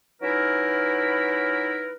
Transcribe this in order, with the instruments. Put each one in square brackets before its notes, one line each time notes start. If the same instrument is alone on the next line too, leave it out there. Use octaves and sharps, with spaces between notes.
[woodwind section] F#3 C#4 D#4 E4 A#4 B4